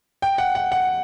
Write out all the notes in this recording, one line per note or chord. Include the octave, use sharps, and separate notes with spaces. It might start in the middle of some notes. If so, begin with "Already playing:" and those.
G5
F#5
F#5
F#5